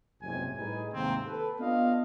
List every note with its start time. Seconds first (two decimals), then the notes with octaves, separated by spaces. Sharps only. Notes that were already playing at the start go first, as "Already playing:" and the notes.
0.22 F#1 B1 F2 G#2 C3 G#5
0.57 A2 G3 D#4 G#4 B4 G#5
0.93 D#2 G#2 C3 D#3 A#3 C4
1.27 A4 B4
1.60 B3 D4 F4 D#5 F5